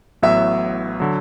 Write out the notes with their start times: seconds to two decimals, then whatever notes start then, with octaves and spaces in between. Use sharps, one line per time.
0.22 A1 A2 F#3 B3 E5
1.00 D3 F#3